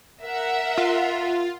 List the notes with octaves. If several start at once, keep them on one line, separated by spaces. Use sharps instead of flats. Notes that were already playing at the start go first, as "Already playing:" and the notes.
A#4 E5 F#5
F4